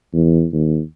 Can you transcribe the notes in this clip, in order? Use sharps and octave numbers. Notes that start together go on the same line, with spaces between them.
E2
D#2